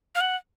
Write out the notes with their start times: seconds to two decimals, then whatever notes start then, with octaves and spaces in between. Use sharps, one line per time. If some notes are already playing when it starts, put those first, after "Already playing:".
0.15 F5
0.21 F#5